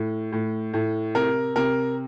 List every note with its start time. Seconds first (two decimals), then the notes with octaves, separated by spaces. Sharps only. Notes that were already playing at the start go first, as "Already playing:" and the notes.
Already playing: A2
0.32 A2
0.73 A2
1.15 C3 A#4
1.56 C3 A#4